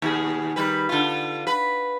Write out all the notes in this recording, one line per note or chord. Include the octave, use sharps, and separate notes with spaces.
D#2 B2 G#4
D#3 G3 B4
D3 F4
B4